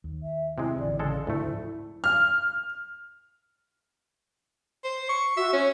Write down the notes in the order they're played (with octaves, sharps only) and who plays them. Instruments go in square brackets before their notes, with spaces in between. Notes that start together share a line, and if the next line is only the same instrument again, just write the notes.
[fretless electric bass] D#2
[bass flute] E5
[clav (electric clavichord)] C3 G#3 [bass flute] E4
[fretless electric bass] A1 D3 E3 [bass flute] D5
[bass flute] C#3 [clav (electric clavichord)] G#3 A4
[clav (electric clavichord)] D2 A3 [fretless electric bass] G#2 C#3 F3 [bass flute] E4
[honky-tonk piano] F6
[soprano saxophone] C5
C#6
[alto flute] F#4 [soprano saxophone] E5
[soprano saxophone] C#4 [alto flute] C#5